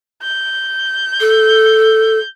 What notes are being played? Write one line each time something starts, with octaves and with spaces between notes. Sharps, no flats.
G6
A4